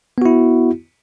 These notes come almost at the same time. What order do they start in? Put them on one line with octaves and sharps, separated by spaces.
B3 F#4 E4